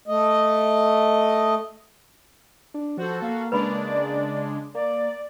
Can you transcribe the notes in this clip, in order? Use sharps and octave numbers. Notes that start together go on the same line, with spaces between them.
A3 D#5
D4
F3 F#4 A4 C5
A#3 F5
C#3 G#3 D4 B4 D5 B5
A#3 D5